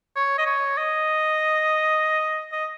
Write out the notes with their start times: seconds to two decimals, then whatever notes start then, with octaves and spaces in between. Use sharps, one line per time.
0.16 C#5
0.38 D#5
0.46 C#5
0.77 D#5
2.52 D#5